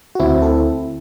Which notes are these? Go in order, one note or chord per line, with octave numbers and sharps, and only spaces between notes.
F#4
D2 C4 E4
A4